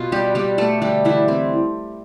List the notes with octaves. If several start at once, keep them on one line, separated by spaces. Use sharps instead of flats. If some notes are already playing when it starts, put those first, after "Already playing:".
Already playing: B2 F4
G3 B3 G4
G3 B3 G4
B2 A3 A4
D3 G3 G4
D3 E3 E4
G3 C4